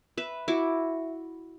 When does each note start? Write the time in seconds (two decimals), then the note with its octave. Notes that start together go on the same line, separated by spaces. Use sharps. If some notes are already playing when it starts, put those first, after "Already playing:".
0.18 B4 E5
0.48 E4 F#4 D6